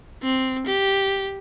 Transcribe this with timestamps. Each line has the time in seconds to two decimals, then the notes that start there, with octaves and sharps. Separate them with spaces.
0.23 C4
0.66 G4